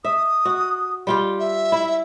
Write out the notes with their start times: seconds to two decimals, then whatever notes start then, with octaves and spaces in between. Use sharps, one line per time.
0.05 E5 D#6
0.45 F#4
1.07 G3 F4 G4
1.40 E5
1.72 E4